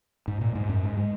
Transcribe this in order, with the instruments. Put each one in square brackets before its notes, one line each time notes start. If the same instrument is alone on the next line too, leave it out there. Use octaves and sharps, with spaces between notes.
[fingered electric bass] G#2
A#2
G#2
F#2
G#2
G#3